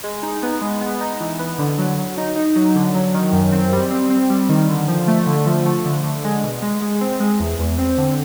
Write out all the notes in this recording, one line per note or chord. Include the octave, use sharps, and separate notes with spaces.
G#3
D#4
B3
G#3
B3
D#4
E3
B3
D3
F#3
F#3
D#4
D#4
F#3
D3
F#3
D#3
F#2
C4
G3
C4
C4
G3
D#3
D3
F3
A3
D3
F3
A3
D3
D3
G#3
B2
G#3
G#3
C4
G#3
E2
E2
C4
D3